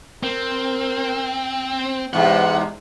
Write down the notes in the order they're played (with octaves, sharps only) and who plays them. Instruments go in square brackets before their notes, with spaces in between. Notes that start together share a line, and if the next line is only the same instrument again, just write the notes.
[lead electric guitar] C4 [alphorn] A#4
[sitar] E2 G#2 C3 [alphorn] G#3 [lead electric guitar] F#5